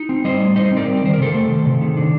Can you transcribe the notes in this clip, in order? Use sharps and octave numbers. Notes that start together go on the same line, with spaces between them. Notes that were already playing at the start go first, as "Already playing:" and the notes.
Already playing: D#4
C4
G3 C5 D#5
A2
D#4 C5 D#5
C4 A#4 D5
G3
D5
D#3 C5
A#4
C3 A4 C5
A3
D#3
C3
D#3
D4